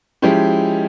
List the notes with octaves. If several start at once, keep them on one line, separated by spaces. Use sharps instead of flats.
F3 G#3 C#4 E4 G4